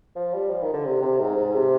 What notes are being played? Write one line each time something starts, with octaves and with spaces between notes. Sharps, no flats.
F3
G3
F3
D#3
D3
C3
C3
G#2
G#2
C3